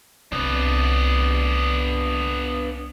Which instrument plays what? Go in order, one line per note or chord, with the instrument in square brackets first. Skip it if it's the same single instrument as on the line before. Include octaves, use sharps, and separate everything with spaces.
[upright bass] C2 [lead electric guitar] B3 D4